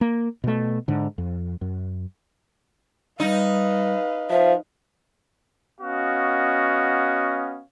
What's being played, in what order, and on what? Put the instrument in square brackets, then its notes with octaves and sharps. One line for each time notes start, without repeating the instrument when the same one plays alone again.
[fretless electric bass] A#3
B2 A3
G#2 D3
F2
F#2
[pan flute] G3 [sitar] D#4 [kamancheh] B4 F5
[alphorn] F3 [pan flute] E5
[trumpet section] B3 C#4 F#4 D#5 F5